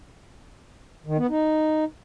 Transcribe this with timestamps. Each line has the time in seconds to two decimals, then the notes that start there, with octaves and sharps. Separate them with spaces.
1.06 D#3
1.18 B3
1.29 D#4